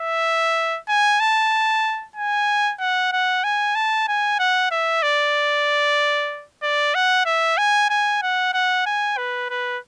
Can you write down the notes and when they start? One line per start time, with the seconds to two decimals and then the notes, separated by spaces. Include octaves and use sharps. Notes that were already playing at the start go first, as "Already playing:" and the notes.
Already playing: E5
0.89 G#5
1.20 A5
2.16 G#5
2.79 F#5
3.12 F#5
3.44 G#5
3.75 A5
4.08 G#5
4.39 F#5
4.71 E5
5.02 D5
6.63 D5
6.95 F#5
7.26 E5
7.58 G#5
7.90 G#5
8.22 F#5
8.54 F#5
8.86 G#5
9.18 B4
9.50 B4